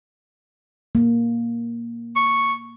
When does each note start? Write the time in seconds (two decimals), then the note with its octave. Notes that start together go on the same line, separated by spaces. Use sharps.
0.95 A#3
2.16 C#6